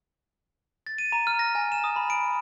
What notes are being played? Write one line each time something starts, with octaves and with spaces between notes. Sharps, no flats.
A6
D#7
A#5
F6
A#6
G#5
E7
D#6
B5
D7